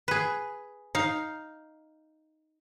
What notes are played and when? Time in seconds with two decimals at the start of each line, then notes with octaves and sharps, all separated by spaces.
0.08 G#4 B4
0.95 D#4 F5